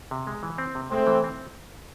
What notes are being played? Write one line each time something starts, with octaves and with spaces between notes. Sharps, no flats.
C3
G#3
E3
C4
C3
G#3 A3 C4
E3
C4